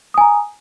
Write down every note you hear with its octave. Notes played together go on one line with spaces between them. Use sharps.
G#5 A#5 D#6